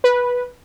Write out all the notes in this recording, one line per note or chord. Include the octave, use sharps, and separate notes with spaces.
B4